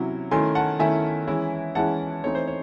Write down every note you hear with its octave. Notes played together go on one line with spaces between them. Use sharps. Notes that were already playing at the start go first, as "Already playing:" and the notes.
Already playing: C3 F#3 C#4 E4
D#3 A3 C#4 E4 G#5 C6
F#5 A5
D#3 A3 C#4 E4 E5 G#5
E3 G#3 C#4 E4
E3 G#3 C#4 E4 F#5 A5
E3 A3 C4 D#4 C#5
C5
C#5